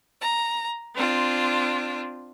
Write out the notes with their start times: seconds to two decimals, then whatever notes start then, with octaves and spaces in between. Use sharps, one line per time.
0.20 A#5
0.94 C4 D4 F4